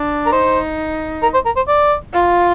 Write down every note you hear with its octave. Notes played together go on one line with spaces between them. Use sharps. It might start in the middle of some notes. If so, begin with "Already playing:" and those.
Already playing: D4
A#4
D#4 C5
A#4
C5
A#4
C5
D5
F4